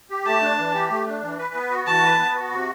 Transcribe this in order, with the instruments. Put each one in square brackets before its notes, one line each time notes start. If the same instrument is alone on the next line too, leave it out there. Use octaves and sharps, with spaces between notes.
[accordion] G4
[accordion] A3 [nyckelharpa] A5
[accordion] D4
E3
G4
A3
D4
E3
B4
B3
F#4
[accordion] E3 [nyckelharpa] A5
[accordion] B4
B3
F#4
C3